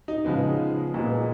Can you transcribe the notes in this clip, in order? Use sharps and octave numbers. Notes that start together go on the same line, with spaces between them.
D#4
C#3 F3 G#3 B3 D#4
A#2 G#3 B3